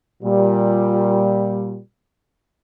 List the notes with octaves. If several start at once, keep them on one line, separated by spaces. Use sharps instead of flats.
A#2 G3